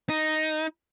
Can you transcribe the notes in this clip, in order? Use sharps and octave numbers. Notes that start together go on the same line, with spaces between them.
D#4